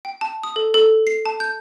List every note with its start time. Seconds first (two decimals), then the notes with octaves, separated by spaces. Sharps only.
0.05 G5
0.21 A5
0.43 D#6
0.56 A4
0.74 A4
1.07 C7
1.26 A5
1.40 G6